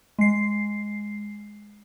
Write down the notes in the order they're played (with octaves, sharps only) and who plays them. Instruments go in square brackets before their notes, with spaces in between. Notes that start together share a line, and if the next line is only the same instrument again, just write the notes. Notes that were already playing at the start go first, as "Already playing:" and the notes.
[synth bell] G#3 C7